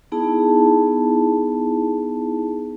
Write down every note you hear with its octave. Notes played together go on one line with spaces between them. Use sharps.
B3 D#4 E4 G#4 A5